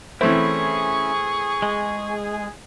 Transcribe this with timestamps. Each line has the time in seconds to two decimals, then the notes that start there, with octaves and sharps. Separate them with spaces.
0.21 E3 A3 C4 C#4 E4 G#4 C#6
1.62 G#3